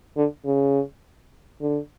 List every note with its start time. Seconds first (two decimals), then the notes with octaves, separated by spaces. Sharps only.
0.17 D3
0.45 C#3
1.61 D3